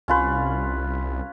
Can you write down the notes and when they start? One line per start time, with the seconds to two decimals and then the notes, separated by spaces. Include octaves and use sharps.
0.08 C2 C#4 F4 B4